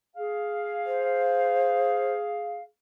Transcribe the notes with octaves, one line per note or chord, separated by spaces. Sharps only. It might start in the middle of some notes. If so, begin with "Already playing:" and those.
G#4 F5
C5